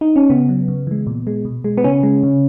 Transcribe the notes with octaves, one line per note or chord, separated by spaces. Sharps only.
D#4
C#4
C#3 B3
F#3
C#3
E3 G#3
A#2
G#3
B2
G#3
B3
C#3 C#4
G#3
C#3